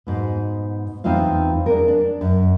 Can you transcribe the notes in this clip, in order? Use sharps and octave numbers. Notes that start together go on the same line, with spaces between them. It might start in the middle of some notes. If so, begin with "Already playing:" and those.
G#2 B2
E2 C4 D#4 F4 F5
D4 G#4 A#4
D4
F#2